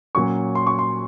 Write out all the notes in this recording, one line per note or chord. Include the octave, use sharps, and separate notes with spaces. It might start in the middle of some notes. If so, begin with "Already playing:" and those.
A#2 F#3 C#4 C#6
C6
C#6
C6